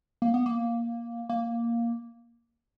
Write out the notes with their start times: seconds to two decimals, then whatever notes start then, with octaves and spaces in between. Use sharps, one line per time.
0.22 A#3
0.34 B3
0.46 A#3
1.29 A#3